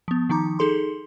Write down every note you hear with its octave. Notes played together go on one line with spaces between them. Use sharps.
F3 B3
D#3 F3 D#4 A#5 D6
D#4 G#4 A4 C6